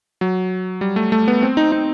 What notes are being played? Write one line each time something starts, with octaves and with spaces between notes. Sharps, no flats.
F#3
G3
A3
A3
B3
C4
D#4
D#4